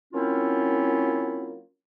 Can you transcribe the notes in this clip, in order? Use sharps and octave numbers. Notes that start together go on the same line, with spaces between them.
F#3 A#3 C4 C#4 E4 F4